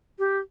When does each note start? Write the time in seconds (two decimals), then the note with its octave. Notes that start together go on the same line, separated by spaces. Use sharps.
0.18 G4